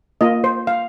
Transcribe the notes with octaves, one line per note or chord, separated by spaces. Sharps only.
A#3 F4 D#5
C5
F5